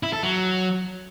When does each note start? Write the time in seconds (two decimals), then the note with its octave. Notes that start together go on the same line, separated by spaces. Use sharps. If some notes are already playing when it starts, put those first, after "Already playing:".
0.03 E4
0.13 A4
0.23 F#3